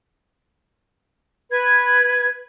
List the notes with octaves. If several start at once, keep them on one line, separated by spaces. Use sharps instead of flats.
B4 G#6